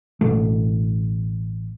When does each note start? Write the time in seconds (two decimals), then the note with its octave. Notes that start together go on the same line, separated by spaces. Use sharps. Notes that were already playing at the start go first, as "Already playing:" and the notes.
0.21 A1 B2 A3